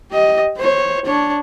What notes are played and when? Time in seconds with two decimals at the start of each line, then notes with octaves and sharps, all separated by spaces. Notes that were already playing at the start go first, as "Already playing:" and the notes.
0.11 G4 D#5
0.58 C5 C#5
1.06 D4 C#5